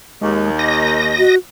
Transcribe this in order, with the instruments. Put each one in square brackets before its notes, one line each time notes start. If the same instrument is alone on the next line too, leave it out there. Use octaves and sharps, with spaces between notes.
[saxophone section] D#2 [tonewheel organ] G#3
[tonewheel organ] D#5 A#6
[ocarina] F#4